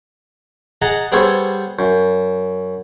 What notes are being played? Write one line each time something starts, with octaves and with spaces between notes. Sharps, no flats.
G#4 D#5 F#5 A5 A#5
G3 B3 G#4 A4 C5 C#5
F#2